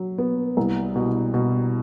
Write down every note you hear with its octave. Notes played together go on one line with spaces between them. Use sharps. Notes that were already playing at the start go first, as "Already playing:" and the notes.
Already playing: F#3
B3
C2
B2
B2